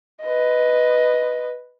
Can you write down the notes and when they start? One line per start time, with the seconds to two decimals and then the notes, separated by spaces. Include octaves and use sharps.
0.23 B4 D#5